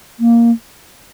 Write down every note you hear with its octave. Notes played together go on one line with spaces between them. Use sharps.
A#3